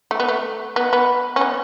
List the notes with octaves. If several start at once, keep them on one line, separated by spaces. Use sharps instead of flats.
A3
B3
A3
B3
B3
C#4
B3